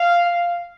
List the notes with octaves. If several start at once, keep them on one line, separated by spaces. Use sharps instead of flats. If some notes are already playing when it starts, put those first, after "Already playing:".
Already playing: F5